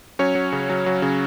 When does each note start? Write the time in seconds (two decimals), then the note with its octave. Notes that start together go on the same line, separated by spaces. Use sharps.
0.19 F#3 C#4 C#5
0.35 F#3
0.52 C#3
0.69 F#3
0.86 F#3
1.02 C#3